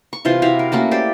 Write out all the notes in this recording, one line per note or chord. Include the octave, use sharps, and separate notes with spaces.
C#6
C3 E3 F4 C5
E4 F#4 G4 F5
A#4
A3 A#3 C#4 F#4
G4 C5 D5